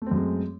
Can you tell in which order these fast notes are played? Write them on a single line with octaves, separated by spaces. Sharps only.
A3 C4 F#2 G#3